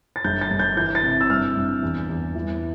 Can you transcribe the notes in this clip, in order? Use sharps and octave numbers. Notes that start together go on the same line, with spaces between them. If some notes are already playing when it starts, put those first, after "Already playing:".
A6
G1 G6
A6
G1
G6
E3 G6
A6
C3
E6
G2 F6
G2
E2
E2
E3